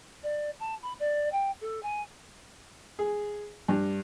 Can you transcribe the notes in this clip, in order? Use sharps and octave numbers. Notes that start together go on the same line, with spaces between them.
D5
A5
B5
D5
G5
A4
G#5
G#4
G2